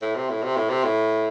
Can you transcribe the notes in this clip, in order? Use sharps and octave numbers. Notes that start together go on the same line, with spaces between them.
A2
C3
A2
C3
A2
C3
A2